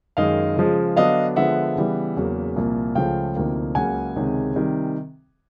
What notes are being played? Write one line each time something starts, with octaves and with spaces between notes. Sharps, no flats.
F#2 D#3 G#3 D#5 F5
C#3 F3 G#3
D3 F#3 B3 D4 D#5 F5
D3 F3 G#3 B3 E5 F#5
C#3 E3 G3 B3
E2 C#3 F#3 A#3
C2 A#2 F3 A#3
C#2 C#3 F3 A3 C#4 F5 G5
D2 C3 F3 A#3 D#4
C#2 C#3 F#3 A#3 F#5 G#5
C#2 C3 D#3 G#3 C#4
C3 D#3 G3